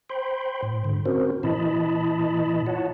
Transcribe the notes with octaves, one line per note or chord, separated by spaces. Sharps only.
C5 G5 B5 C6
A2
G#2 D3
C4 C#4 F#4 A#4 C5
A#2 E3 E4 D#5 A5 B5
F4 C#5 F#5 A5